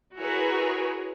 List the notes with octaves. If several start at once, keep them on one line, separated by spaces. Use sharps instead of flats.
E4 F#4 G#4 A#4 B4 C#5